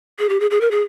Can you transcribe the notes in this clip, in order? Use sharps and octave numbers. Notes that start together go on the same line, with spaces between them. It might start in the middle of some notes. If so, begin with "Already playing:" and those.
G#4
G4
G#4
G#4
A#4
G#4